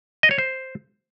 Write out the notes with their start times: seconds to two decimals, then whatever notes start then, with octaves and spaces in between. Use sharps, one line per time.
0.23 D#5
0.31 C#5
0.38 C5